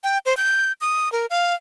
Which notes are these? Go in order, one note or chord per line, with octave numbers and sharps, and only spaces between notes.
G5
C5
G6
D#6
A#4
F5